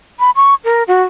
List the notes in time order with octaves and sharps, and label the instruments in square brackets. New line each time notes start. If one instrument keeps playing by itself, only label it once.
[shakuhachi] B5
C#6
A#4
F#4